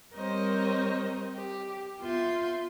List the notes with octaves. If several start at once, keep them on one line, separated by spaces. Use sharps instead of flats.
G3 C4 A#4 C5 C#5 D#5
G4
B3 F4 E5 C6 G6